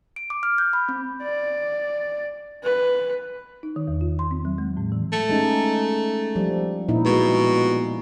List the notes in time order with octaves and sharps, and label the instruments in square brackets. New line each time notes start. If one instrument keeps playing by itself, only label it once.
[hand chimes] D7
D6
F6
G6
B5
C4
[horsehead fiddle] D5
B4
[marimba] D#4
D#3
E2
F4
C6
C4
F#3
G#3
A2
E3
[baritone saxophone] A3
[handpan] G#3 C#4 D#4
F3 G3
A#2 D#4 E4
[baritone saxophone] B2 [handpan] G#3